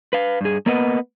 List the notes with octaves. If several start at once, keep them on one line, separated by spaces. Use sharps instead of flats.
B4 F5
G2 G#4
A#3 B3 A#4 B4 D#5 F#5